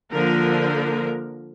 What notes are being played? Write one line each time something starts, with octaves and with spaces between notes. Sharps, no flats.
D3 F3 A#3 A#4